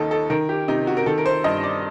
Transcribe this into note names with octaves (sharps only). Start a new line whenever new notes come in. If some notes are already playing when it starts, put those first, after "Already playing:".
Already playing: D#2 D#3 A4 D#5
A4
D#3 A#4
G4
C3 D#4
F#4
A#4
D#3 A4
A#4
C5
G2 D#5
D5